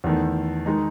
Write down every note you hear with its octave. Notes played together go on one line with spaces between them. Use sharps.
E2 D#3 A3
D#3 G#3 D#4